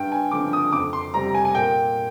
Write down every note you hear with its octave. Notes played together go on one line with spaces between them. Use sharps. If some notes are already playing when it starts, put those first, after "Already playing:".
Already playing: G2 G5
G#5
D3 F3 C4 D6
D#6
F2 D6
C6
C3 G3 C4 A#5
G#5
G#5
A#2 G5